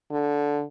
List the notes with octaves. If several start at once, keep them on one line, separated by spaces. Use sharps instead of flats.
D3